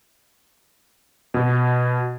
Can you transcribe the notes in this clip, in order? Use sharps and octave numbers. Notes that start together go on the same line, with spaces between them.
B2